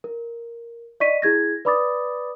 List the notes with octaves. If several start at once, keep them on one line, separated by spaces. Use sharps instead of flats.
A#4
D5 D#5 C#6 B6 D#7
E4 G#4 G#6 A#6
B4 D5 B5 D6 D#6 A6